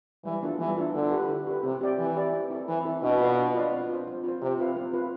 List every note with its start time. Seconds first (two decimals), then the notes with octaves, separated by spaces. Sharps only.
0.25 E3 G3
0.43 B3 D4 F4 A4
0.60 E3 G3
0.77 B3 D4 F4 A4
0.94 D3 E4
1.12 G4 B4
1.29 E4
1.47 G4 B4
1.63 C3 C4
1.81 G4 D5 G5
1.98 E3 C4
2.17 G4 D5 G5
2.33 C4
2.50 E4 A4
2.68 E3 C4
2.85 E4 A4
3.03 B2 D4
3.20 F4 B4 D5 F5
3.37 D4
3.54 F4 B4 D5 F5
3.72 C4
3.90 F4 C5
4.07 C4
4.24 F4 C5
4.42 C3 C4
4.59 F4 B4 F5
4.76 C4
4.93 F4 B4 F5